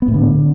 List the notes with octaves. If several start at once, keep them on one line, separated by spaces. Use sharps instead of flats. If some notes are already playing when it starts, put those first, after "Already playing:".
B3
A2
D3